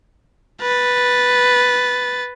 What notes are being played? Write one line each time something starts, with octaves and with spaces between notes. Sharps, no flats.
B4 A6